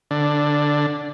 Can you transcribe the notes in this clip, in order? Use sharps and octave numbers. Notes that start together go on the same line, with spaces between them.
D3